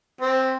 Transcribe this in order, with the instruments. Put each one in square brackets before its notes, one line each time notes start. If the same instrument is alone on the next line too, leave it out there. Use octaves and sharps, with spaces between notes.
[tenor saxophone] C4